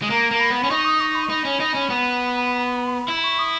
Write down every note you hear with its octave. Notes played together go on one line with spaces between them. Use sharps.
G#3
A#3 A#5
A#3
B5
B3
C#4
D#4 C#6
D#6
C#6
B5
C#6
D#4 B5
C#4
D#4
C#4
B3
E4
B5
C#6
D#6